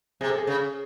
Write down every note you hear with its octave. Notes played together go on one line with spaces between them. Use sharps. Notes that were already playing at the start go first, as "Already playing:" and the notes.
C3 G#4
A4
G#4
C#3